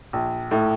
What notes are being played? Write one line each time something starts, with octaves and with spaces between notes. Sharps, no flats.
A#1
A2